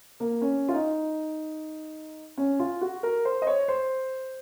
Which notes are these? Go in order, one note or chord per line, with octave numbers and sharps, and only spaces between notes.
A#3
C#4
F4
D#4
C#4
F4
F#4
A#4
C5
D#5
C#5
C5